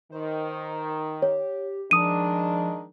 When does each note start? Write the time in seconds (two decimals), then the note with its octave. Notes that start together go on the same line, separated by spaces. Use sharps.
0.12 D#3 C5
1.22 G4 C#5
1.91 D#3 F3 G#3 D4 D#6 D#7